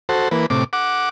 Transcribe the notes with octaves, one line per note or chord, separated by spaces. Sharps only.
F#4 A4 C5
E3 A#3 B4
A2 C3 D6
F#5 D6